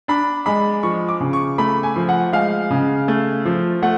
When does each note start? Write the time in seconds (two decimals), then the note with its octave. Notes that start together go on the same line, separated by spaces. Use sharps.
0.08 D4 B5
0.46 G#3 B5
0.83 F3 C#6
1.09 D6
1.20 C#3
1.33 C#6
1.58 A3 B5
1.83 G#5
1.96 F3
2.09 F#5
2.33 G#3 F5
2.70 C#3
3.08 A3
3.45 F3
3.82 A3 F#5